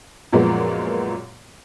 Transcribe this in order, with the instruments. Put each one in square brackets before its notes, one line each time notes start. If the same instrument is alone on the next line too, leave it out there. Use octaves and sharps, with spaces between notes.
[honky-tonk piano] F#2 A#2 F3 G#3 A#3 B3